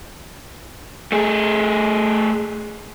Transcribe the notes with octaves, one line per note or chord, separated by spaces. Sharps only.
A3 G#4